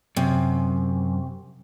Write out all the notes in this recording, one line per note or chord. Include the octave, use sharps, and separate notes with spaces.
F#2 C3